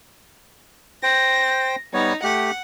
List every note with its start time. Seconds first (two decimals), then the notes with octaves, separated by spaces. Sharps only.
1.03 C5 G5 A#6
1.94 G3 B3 D#4 C#5
2.23 A3 G4 F#5